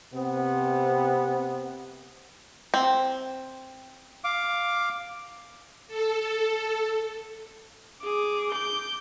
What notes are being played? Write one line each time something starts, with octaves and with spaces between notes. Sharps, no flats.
C3 B3 C4
C4
F5 D6
A4
G#4 D6
D6 G6